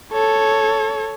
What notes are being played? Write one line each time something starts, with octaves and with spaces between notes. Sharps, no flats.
A4 C#5